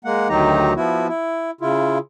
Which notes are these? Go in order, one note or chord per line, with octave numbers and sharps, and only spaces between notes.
G#3 A#3 F#5
D2 D#3 F#3 D#4 G4 A#5
F3 B3 E4 F#4
E4
C#3 E4 F4